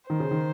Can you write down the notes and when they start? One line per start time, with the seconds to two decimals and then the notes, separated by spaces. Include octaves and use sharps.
0.10 D#3 C5
0.20 C#3
0.31 D#3